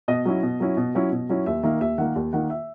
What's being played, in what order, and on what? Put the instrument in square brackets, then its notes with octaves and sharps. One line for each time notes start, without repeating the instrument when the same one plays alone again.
[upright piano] B2 D#5
F#3 C#4 E4
B2
F#3 C#4 E4
B2
F#3 C#4 E4
B2
F#3 C#4 E4
D#2 E5
D#3 A#3 E5
D#2 E5
D#3 A#3 F#5
D#2
D#3 A#3 F#5
E5